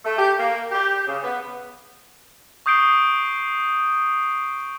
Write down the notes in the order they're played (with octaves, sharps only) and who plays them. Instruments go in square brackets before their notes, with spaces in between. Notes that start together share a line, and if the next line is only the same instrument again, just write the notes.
[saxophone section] A3
G4
A#3
G4
C#3
B3
[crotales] C#6 D#6 G6 C7 D7 G7